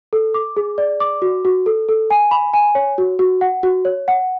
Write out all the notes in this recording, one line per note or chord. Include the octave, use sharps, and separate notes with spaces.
A4
D6
G#4
D5
D6
F#4
F#4
A4
A4
G#5
B5
G#5
C#5
F#4
F#4
F#5
F#4
C#5
F#5